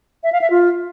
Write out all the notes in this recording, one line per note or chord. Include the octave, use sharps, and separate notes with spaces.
E5
F5
E5
F4